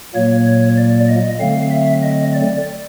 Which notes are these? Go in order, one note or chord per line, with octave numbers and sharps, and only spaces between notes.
A#2 F#3 A#3 C#5
C#5
D5
D#5
D3 F#3 A3 C4 F5
E5
D#5
D5